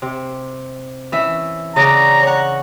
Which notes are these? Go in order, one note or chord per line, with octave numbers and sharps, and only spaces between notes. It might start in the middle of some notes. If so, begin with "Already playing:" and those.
C3
E3 C#4 E5
C#3 D5 F#5 A#5
C#5 F#5